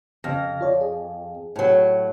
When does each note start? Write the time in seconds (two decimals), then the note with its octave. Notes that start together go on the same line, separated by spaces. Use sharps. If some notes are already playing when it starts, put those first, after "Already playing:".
0.24 F2 C#3 F6 A#6
0.61 F4 C#5 D5
0.81 G#4
1.56 A2 F#3